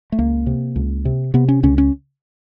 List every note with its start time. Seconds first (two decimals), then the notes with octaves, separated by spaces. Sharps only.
0.12 A3
0.18 C#2 A#3
0.46 C3
0.76 C#2
1.05 C3
1.34 C3 B3
1.48 C#4
1.63 C#2 C#4
1.78 C#4